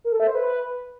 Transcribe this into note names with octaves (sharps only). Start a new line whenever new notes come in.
A#4
A4
E5
C5
B4